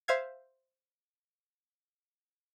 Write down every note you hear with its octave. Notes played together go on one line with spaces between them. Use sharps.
C5 E5 F5 G#6